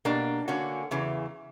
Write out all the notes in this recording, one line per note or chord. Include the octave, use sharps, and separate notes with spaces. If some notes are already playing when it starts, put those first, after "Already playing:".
B2 A#3 D4 G4
D3 A#3 C#4 F#4
E2 C#3 E3